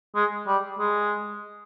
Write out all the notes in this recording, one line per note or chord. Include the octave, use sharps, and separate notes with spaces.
G#3
G3
G#3